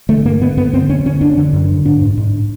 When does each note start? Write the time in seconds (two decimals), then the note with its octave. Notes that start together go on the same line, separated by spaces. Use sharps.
0.09 D3 A3
0.25 G2 A#3
0.41 D3 B3
0.57 F#2 B3
0.73 D3 C4
0.89 F#2 C#4
1.05 D3 C#4
1.21 F#2 D4
1.37 D3
1.53 F#2
1.69 D3
1.86 G#2 D4
2.02 G#2
2.18 G#2